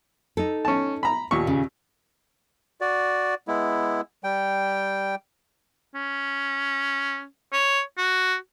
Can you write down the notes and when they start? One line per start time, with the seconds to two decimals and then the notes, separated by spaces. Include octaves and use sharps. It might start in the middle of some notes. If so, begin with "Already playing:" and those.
0.37 D#4 A4
0.65 C#4 A5
1.03 A#5 B5
1.31 D#2 A#2 C#6
1.47 C#3
2.81 F#4 D5
3.48 G#3 B3 E4
4.24 G3 G5
5.94 C#4
7.53 C#5
7.98 F#4